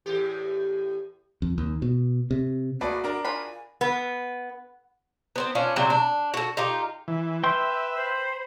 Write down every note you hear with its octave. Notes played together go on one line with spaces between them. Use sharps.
E2 A2 G4
F2
D#2
B2
C3
A3 A#3 F#4 G#4 B4 D5
D4 A#4 D5
F4 F#4 G#5 B5
B3
B3 C4 C5
C#4 D4 F4
C3 F#3 C4
D4
F#4 A4
D#4 F4 G4
E3
B4 E5 G5 C6
C5 B5